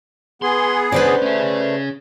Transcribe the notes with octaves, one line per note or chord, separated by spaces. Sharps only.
B3 G#4 C6
C#3 D4 B4 C5 D5
A3 C#4 G#4